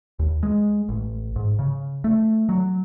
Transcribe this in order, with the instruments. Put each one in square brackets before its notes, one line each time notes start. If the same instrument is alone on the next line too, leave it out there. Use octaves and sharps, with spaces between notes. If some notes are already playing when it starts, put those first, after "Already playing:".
[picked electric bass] D#2
G#3
A1
G#2
C#3
A3
F#3